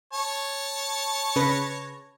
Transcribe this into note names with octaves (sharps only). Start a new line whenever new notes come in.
C#5 A5
C#3 B4 A#6